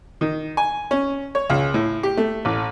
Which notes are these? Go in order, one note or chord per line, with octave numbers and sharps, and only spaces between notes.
D#3
G#5
C#4
C#5
C#2
A2
G4
A3
A1